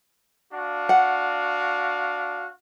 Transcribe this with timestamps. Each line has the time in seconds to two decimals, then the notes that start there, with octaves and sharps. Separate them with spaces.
0.53 D4 F#4 F5
0.89 F#5